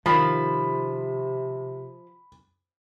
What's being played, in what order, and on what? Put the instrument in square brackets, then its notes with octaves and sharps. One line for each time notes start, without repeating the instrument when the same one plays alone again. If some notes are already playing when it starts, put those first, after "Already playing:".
[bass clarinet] C3 [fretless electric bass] D#3 [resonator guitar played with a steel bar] F3 [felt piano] B5